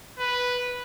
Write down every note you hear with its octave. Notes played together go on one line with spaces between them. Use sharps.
B4